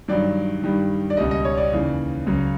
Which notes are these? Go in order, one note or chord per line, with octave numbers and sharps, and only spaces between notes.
G2 D#3 F#3 D5
G2 D#3 G3
D5
C#2 B2 G3 D#5
D#5
C#5
D5
D#2 C#3 E3
C#2 C#3 F#3